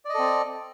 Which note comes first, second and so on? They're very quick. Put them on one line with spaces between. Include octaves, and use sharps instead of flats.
D5 D#5 A4 C4